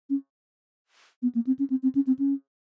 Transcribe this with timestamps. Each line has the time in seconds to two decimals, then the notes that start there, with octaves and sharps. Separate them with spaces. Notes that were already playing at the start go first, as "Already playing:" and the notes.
0.10 C#4
1.22 B3
1.35 A#3
1.47 C4
1.59 C#4
1.70 C4
1.83 C4
1.95 C#4
2.07 C4
2.19 C#4